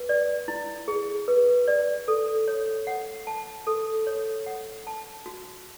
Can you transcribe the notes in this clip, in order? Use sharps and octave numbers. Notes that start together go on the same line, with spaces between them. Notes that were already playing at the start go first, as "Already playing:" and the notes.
Already playing: B4
D5
E4
G#4
B4
D5
A4
C#5
F#5
A5
A4
C#5
F#5
A5
F#4